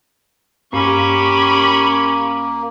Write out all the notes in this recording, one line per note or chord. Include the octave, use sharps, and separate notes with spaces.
G2 A#3 C#4 G4 B5 C#6